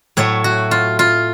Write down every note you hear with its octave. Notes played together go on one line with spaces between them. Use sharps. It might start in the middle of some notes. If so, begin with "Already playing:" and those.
A2 F#3 A3 C#5
F#4
F4
F4